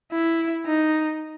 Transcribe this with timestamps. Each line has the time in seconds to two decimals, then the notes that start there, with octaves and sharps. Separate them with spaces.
0.12 E4
0.66 D#4